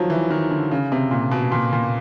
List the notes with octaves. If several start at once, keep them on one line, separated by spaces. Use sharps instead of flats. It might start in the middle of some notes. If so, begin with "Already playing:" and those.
Already playing: D#3 F3 F#3
E3
D#3
D3
C#3
C3
A#2
B2
A#2
A#2